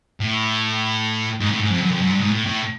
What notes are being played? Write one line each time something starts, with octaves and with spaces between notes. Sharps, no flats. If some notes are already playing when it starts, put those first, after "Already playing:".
A2
G#2
A2
G#2
F2
F#2
F2
F#2
G2
G#2
A2
A2